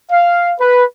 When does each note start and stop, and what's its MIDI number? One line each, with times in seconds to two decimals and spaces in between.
0.10 0.53 77
0.60 0.84 71